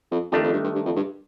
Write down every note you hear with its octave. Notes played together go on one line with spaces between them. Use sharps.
F2
F2 D#3 A3 D4 G4
F2
G2
G2
G2
F2
G2